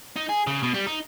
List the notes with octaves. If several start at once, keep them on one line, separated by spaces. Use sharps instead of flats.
D#4
G#4
C#3
B2
G3
D#4